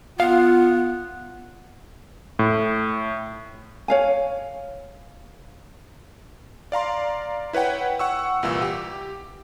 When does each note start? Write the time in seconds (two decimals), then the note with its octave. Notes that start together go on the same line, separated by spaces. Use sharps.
0.20 B3 F4 F5 F#5
2.39 A2
3.88 C#5 F5 G#5
6.72 D5 F5 A#5 C6
7.53 E4 B4 C#5 F#5 G5
7.99 F#5 C#6 E6
8.43 C2 A#2 E3 F4 E6
8.62 G4